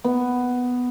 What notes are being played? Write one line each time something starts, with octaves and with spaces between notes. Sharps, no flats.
B3